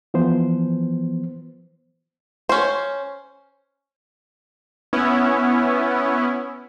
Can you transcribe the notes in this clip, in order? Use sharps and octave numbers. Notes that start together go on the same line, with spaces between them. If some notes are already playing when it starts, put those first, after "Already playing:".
E3 F3 B3 C5
C#4 C5
B3 C#4 E4